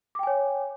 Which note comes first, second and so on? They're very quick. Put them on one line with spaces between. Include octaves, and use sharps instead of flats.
D6 G5 G#5 C#5